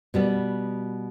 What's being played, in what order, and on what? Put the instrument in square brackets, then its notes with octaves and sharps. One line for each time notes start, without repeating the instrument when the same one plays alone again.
[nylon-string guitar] B2 G3 B3